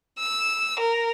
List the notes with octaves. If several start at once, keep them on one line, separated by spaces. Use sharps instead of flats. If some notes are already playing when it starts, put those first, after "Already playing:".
E6
A#4